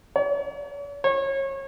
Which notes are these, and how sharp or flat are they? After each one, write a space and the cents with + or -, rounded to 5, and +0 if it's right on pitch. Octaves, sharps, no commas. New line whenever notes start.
C#5 +45
C#5 -30